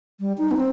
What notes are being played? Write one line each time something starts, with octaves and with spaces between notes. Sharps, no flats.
G3
D#4
B3
C4